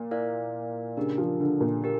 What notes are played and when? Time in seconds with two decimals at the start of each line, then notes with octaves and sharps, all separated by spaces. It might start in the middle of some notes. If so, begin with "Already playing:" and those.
Already playing: A#2
0.11 E4 A#4 D5 F5
0.97 C#3 D4 G4 A#4
1.18 F3
1.40 D3
1.61 A#2
1.82 D4 G4 A#4